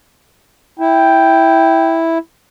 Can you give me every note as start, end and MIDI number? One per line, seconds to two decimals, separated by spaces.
0.79 2.18 64
0.79 2.02 79